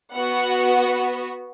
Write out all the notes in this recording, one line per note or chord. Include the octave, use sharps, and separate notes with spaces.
B3 F#4 F#5